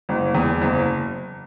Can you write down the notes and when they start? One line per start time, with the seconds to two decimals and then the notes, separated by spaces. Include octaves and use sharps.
0.09 F#1
0.35 E2
0.61 F#1